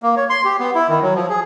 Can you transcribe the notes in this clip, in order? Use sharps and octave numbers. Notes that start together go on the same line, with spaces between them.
A#3
C#5
C6
G4
B3
E4
D#3
F#3
F3
G#4